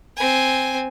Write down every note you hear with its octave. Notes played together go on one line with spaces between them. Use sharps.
C4 G#5